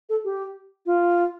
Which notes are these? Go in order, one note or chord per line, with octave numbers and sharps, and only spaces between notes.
A4
G4
F4